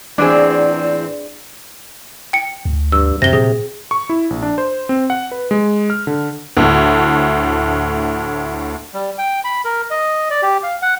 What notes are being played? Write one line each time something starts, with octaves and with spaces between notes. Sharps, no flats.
E2 A2 C4 D4 G#4
G5 C#7
D2
G2 E6
F#2 C3 A#6 G7
A#2 G#4
C#6
E4
A#1
D4
C5
C4
F#5
B4
G#3
F6
D3
D2 A2
G3
G5
B5
A#4
D#5
D5
G4
F5
F#5